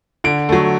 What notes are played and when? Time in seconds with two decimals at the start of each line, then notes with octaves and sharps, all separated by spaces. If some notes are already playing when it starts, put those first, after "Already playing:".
0.24 D3 D7
0.49 F#3 A3